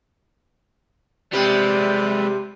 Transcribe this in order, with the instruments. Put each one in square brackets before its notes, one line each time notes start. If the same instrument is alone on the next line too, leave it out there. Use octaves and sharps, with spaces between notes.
[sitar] C3 G4 [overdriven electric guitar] G3 G#3 [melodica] B4 E5 [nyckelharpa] D5